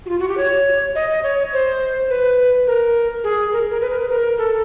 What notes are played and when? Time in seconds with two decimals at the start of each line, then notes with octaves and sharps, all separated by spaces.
0.06 F#4
0.09 F4
0.19 F#4
0.28 G4
0.37 C#5
0.95 D#5
1.10 D#5
1.23 C#5
1.53 C5
2.10 B4
2.67 A#4
3.24 G#4
3.53 A#4
3.71 A#4
3.81 B4
3.90 A#4
4.00 B4
4.09 A#4
4.38 A4